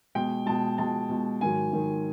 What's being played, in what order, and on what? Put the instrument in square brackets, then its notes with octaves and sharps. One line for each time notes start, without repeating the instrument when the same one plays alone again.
[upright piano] B2 G#3 G5
B2 G#3 A5
B2 G#3 A5
B2 G#3
G#2 D#3 F#3 G#5
G#2 D#3 F#3